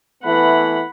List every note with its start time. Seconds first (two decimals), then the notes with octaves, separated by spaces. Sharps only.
0.23 E3 A3 B3 F#5 B5